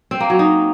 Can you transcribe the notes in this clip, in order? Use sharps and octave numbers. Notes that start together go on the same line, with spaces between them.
C4
A#3
F#3
D#4